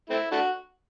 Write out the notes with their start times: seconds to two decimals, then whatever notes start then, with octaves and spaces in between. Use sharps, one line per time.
0.10 A3 C4 E4
0.32 A3 D4 F#4